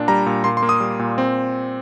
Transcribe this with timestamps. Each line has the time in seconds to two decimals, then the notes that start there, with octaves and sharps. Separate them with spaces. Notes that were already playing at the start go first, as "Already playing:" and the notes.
Already playing: A#2 D4
0.08 G3 A#5
0.26 A#2
0.44 A#2 C6
0.57 C6
0.63 A#3
0.69 D#6
0.80 G3
0.99 A#2
1.18 C4